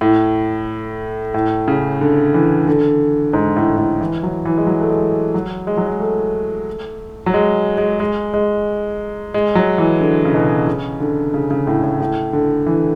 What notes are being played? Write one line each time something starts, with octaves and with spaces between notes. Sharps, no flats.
A2
A2
C#3
D3
E3
D3
G#2
A2
A2
E3
F#3
E3
G#3
F#3
A3
G#3
F#3
G#3
F#3
G#3
A3
F#3
G#3
G#3
G#3
G#3
G#3
F#3
E3
D3
C#3
B2
C#3
D3
C#3
C#3
A2
A2
A2
D3
E3